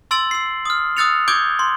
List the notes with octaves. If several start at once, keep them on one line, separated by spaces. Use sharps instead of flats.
C6 E6 A6 D7 F#7
E6 C7
D#6 F6
D#6 E6 F#6 A6 C#7 F7
D6 D#6 G6 G#6 D7 G7
C6